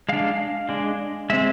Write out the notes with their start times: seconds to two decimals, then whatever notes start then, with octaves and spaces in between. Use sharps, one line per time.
0.09 G#3 D4 F5
0.69 G#3 D4
1.30 G#3 C4 E5